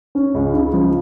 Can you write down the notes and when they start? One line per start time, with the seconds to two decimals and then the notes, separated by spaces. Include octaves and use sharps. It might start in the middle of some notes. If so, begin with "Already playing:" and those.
0.15 C#4
0.34 C#2
0.54 C#3
0.73 F3